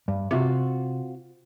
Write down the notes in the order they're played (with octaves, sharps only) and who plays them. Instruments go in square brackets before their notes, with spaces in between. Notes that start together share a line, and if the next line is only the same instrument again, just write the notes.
[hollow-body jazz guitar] G2
[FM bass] C3 [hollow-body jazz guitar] C4 F4 F#4